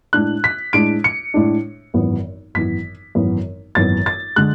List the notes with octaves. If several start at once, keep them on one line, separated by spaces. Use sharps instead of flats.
A2 G#3 D4 F#6
B6
A2 G#3 D4 D7
C#7
A2 G#3 D4
G#1 F#2 E3 B3
G#1 F#2 E3 B3 B6
G#1 F#2 E3 B3
G#1 F#2 E3 B3 A6
A6
D3 G#3 F#6